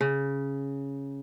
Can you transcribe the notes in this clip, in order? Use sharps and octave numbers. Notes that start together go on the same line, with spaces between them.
C#3